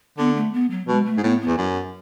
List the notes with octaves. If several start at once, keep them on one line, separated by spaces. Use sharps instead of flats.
D3 B3
A3
B3
F#3
B2 G#3
A3
G#2
A2 B3
B3
E2
F#2